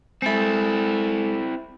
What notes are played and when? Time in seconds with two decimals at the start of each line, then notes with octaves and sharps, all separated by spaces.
0.22 G#3 C4 E4 A4